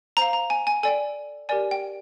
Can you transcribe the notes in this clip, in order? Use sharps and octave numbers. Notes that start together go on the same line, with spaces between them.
C5 F5 A#5
A#5
G#5
G#5
A4 D5 G5 G#5
G4 A#4 D5 G#5
G5